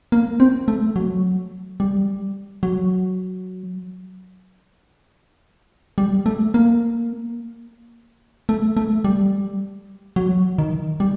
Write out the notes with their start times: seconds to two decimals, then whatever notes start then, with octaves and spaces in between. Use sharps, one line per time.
0.12 A#3
0.40 C4
0.68 A3
0.96 F#3
1.80 G3
2.63 F#3
5.98 G3
6.26 A3
6.54 A#3
8.49 A3
8.77 A3
9.04 G3
10.16 F#3
10.58 D#3
11.00 G3